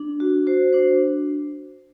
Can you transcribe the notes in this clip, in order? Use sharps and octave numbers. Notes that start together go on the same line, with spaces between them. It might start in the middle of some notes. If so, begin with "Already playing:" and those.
Already playing: D4
F#4
F#4 C5
D4 C5